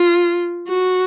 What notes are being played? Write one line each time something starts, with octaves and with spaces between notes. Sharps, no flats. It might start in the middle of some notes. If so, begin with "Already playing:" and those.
Already playing: F4
F#4